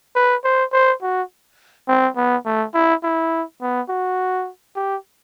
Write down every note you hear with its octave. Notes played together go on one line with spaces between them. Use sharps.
B4
C5
C5
F#4
C4
B3
A3
E4
E4
B3
F#4
G4